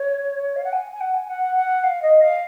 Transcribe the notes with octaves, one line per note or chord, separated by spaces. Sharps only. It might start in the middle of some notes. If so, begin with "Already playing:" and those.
Already playing: C#5
F5
F#5
G#5
G#5
F#5
G#5
F#5
F#5
F5
D#5
F5